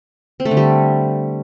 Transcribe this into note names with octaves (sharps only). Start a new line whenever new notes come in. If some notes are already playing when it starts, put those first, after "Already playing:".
C4
A3
D3
G3